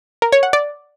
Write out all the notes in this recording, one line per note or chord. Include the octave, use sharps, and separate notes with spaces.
A#4
C#5
F#5
D5